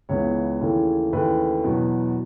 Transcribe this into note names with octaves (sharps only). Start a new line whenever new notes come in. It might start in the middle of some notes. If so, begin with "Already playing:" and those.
C#2 C#3 E3 B3 C#5
D#2 C#3 E3 A3
D#2 C#3 E3 A3 B4
E2 B2 F#3 B3